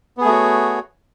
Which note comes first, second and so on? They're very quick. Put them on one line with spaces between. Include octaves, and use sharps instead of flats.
B3 G#4 A3 F#4 C#5